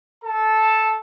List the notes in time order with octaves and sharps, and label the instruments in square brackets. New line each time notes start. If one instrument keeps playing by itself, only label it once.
[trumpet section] A4 A5